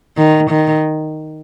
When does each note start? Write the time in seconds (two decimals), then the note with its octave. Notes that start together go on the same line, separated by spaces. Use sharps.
0.17 D#3
0.50 D#3